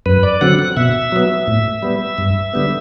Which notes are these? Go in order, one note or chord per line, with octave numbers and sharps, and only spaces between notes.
F#2 B4
D5
D3 F#3 C4 F#5
F#5
B2 E5
F#3 B3
A2
G3 B3
G2
D3 G3 B3